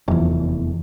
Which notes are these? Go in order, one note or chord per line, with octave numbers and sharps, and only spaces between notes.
F1 E2